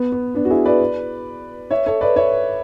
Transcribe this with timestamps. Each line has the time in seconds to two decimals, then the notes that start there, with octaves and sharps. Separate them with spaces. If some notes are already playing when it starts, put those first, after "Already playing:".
Already playing: B3
0.12 B3
0.34 B3 D4
0.45 F#4
0.50 E4 G#4
0.65 B4 D5
1.71 C#5 E5
1.86 A4 C#5
2.01 B4 D5
2.16 C#5 E5